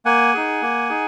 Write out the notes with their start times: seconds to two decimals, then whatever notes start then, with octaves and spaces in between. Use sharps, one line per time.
0.05 A#3 F#5 G#5
0.34 D#4 G#4
0.62 A#3
0.90 D#4 G#4